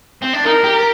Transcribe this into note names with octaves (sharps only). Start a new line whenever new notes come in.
C4
D4
D#4 A#4
G4